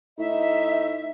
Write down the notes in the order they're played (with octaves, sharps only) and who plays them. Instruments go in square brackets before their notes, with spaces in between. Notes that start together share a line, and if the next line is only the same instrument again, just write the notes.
[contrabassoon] A2 [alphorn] D#4 [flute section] E5